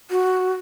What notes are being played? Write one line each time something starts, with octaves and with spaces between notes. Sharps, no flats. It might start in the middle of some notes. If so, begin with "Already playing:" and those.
F#4